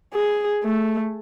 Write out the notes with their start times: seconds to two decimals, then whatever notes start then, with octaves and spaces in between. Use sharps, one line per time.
0.14 G#4
0.64 A3